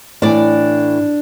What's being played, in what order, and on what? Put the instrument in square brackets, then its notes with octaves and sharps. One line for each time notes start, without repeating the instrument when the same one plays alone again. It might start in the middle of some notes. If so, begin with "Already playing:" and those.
[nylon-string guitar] A2 E3 D4 D5